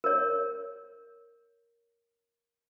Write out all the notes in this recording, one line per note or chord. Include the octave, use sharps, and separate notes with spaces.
A#4 C#5